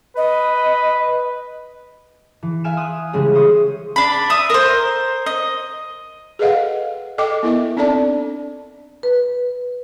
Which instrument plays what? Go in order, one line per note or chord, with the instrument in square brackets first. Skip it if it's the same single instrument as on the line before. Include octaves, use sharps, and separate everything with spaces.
[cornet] B4 [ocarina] D#5
[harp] E3
E5 F5 G#5 F6 D7 E7
C6 D#6 F#6
C#3 E3 G3 G#3 C#4 G#4
C5 E5 C#6 D#6
[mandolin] D4 B5
E5 D#6
A#4 C5
D#5
[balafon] G#4 A4 B4 D#5 F5 F#5
A4 D#5 G5 D6
B3 E4 A#4 E5
C4 D4 D#4 A4 D5 A5
[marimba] B4